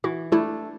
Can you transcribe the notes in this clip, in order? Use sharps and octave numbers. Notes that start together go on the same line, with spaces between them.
E3 F#4
A3 D4 E4